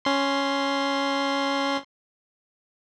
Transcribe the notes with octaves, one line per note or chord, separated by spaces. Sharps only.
C#4 C6